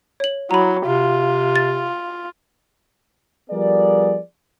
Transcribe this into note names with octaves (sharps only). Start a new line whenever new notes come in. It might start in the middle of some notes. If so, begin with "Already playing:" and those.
C#5 F#7
F#3 E4 A#5 B5
C3 F4
A6
F3 G3 B3 G#4 A#4 D5